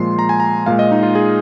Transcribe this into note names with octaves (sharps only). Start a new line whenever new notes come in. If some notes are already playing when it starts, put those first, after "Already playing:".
Already playing: A#2 F3 G#3 C6
A#5
G#5
A#5
A#2 G#3 F5
D#5
D#4
F4
G#4